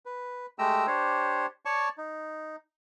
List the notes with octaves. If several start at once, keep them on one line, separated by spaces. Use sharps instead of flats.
B4
G#3 A3 G4 G5 A#5 E6
D4 G4 C5 C#5
C#5 D5 A5 C#6
D#4